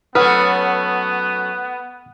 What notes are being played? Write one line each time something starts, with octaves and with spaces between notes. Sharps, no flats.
F#3 A3 B3 C#4 B4 F#5 D#6 F6